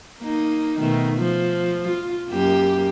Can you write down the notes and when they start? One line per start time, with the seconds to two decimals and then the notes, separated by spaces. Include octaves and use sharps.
0.20 A#3 D#4
0.79 B2 D#3 A3
1.17 F3
1.88 F4
2.30 F#2 A#3 G4